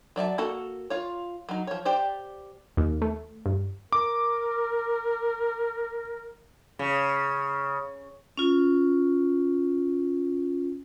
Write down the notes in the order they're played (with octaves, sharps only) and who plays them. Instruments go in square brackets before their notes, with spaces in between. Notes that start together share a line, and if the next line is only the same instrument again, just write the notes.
[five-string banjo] F#3 D5 E5 A5
A#3 F#4 A4 F#5
F4 C#5
F#3 D#4
F3 C#5
G4 C5 D5
[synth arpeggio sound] D#2
A3
G2
[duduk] A#4 [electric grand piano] D6
[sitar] C#3
[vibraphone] C#4 F4